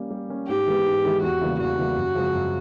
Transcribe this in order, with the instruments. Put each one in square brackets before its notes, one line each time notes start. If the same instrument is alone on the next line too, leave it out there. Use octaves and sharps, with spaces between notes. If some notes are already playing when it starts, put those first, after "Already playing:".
Already playing: [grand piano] G3 A#3 C#4
G3
A#3 C#4
[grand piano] G#2 [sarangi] G4
[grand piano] E3 G#3 B3
G#2
E3 G#3 B3
[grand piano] E2 [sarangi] F#4
[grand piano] C#3 E3 G3 A#3
[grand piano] E2 [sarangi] F#4
[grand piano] C#3 E3 G3 A#3
F#2
C#3 F3 G#3 C4
F#2